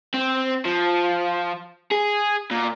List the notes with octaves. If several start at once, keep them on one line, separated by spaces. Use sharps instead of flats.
C4
F3
G#4
A#2